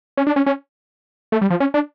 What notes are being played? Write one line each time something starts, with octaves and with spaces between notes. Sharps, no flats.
C#4
D4
C#4
C#4
A3
G3
F3
C#4
D4